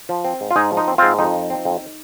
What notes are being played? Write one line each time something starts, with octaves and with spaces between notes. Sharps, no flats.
F3
C4
G#2
F4
G#2 D#4 G#4
F3
D#4
C4
G#2 C4 F4
F2 D#4
F3
C4
F2